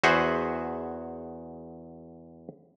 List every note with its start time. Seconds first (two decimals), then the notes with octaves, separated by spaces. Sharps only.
0.04 E2 F#4 G#4 C5 E5 F#5